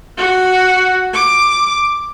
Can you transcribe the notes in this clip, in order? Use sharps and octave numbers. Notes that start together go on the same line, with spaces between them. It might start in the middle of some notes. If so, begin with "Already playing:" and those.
F#4
D6